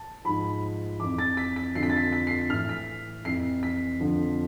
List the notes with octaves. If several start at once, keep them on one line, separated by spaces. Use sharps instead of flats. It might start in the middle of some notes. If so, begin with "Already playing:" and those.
Already playing: A5
G#2 F3 B5
F2 E3 D6
A6
B6
B6
F2 D3 F3 C7
B6
A6
B6
B6
C7
B6
A2 E3 F6
B6
F2 E3 C7
B6
F2 D3 F3